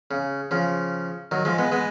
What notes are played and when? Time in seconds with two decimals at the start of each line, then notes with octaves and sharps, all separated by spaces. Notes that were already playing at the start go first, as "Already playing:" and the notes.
0.11 C#3
0.51 C#3 F3
1.31 D#3 F#3
1.45 F3 G#3
1.58 G#3 B3
1.72 G#3 B3